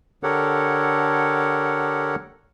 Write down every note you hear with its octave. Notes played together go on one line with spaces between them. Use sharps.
D3 G4 A4 A#4 C#5 F#5